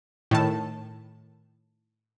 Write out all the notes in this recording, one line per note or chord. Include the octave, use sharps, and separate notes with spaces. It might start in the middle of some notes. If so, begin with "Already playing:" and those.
A2 D#3 A5